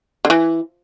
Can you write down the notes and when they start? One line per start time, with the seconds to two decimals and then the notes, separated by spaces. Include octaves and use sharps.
0.25 D3
0.30 E3